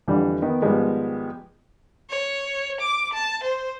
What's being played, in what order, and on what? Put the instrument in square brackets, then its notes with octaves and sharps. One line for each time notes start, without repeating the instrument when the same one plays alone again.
[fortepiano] F2 D3 E3 G3
D#3 B3
G#2 D#3 F3 G3 G#3 B3
[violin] C#5
D6
A5
C5